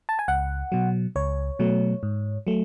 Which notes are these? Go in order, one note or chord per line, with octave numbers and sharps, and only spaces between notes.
A5
G#5
C#2 F#5
B2 F#3
C#2 C#5
B2 F#3 A3
G#2
F#3 A3